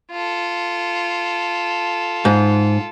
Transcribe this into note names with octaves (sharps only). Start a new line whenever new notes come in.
F4 A4
G#2